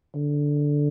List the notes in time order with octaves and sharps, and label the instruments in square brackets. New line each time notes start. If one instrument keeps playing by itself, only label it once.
[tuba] D3